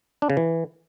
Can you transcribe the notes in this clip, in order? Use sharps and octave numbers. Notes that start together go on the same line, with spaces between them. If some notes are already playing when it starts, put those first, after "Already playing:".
D4
C#3
E3